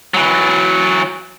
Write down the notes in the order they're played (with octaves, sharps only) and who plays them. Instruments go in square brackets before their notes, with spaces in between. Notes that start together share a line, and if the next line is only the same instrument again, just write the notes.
[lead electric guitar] E3 F#3